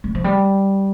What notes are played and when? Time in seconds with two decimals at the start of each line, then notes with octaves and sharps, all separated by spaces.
0.04 G3
0.15 F3
0.24 G3